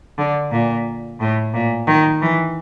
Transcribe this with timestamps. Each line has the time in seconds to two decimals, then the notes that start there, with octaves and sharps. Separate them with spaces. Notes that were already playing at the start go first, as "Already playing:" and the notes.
0.18 D3
0.51 A#2
1.20 A2
1.54 A#2
1.87 D#3
2.22 E3